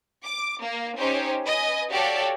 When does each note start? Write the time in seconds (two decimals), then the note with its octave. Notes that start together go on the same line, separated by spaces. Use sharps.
0.25 D6
0.62 A#3
0.97 C#4 D#4 G4 C5 C#5
1.45 B4 D#5 G#5
1.91 F#4 G4 A4 C#5 D5 F5